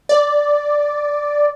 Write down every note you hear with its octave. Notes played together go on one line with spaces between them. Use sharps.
D5